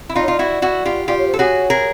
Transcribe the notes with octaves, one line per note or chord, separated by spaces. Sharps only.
E4
D#4 F4 D5
C#5
F4 D5
E4 F#4
E4 F#4
F4 G4
F4 G4 D5
C#5
C5
A4
F#4 G#4 C#5
G#4 A#4